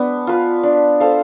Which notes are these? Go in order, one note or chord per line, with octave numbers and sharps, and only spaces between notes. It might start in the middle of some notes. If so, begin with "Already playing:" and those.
Already playing: G#3 B3 D4
F4 B4
D4
A4 C5 F5